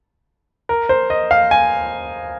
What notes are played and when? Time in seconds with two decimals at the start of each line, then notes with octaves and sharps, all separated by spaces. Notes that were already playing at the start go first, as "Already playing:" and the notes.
0.69 A#4
0.89 C5
1.10 D#5
1.31 F5
1.51 G#5